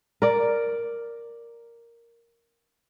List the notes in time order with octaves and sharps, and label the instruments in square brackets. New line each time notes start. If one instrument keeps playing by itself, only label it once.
[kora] A#4 D5